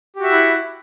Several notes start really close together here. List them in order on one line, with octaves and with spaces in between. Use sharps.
G4 F#4 E5 F#5 E4